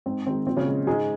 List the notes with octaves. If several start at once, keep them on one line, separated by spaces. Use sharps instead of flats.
G#2 C4
D#3 G#3 C4
A#2 C4
C#3 C#4
G#3
G#2 G#3 G#4